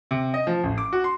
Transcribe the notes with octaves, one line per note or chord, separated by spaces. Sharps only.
C3
D#5
F3
A1
D6
F#4
C6